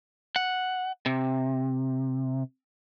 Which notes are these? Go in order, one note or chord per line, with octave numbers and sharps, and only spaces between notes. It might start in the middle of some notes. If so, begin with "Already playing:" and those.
F#5
C3